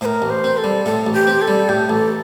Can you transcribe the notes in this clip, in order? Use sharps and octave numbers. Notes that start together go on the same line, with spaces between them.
A2 A#4 C5
A1
C5
C4
A4
G3
A2 A4
A1
G4
C4
A4
G3
A2 G4
A1 A4